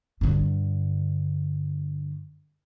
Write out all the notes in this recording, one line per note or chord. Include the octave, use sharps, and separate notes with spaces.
G2 D3